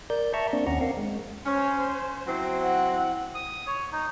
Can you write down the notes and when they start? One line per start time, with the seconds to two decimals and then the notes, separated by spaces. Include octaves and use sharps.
0.10 A#4 D5 G6
0.34 D5 E5 A5 A#5 C#6
0.53 A#3 C4 D4 D5
0.67 D#2 C#4 F#5 A#5
0.81 C4 A#4 F5 F#5
0.97 G#3
1.46 C#4 C5
2.27 F#3 C4 E4
2.63 F#5
3.34 D#6
3.67 C#5
3.92 D#4